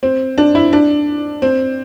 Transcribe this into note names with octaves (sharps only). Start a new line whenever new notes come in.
C4
D4
E4
D4
C4